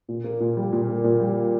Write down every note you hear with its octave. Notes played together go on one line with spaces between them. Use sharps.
A#2
A#3
A#2
G3
A#2
A#3
A#2
G3